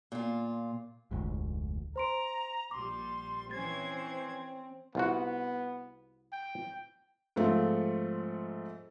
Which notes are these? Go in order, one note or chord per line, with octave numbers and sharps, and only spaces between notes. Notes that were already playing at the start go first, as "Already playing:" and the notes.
A#2 F4
F1 D2 G#2
C5 A#5 C6 D7
A#1 G3 C6 D6
E3 C4 C#4 C5 G#6 A6
C2 B3 F4 F#4
G5
G#2 F3 A3 C4